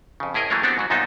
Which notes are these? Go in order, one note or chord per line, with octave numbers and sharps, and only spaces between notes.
F2 C#3
A2 E4 G#4 A#4 D#5
E3 F#3 A3 A#3 D4 C#5
B3 C4 D4 F#4 G4
G#2 F#3 F#4
F#2 A#2 B3 D#4 A4 C5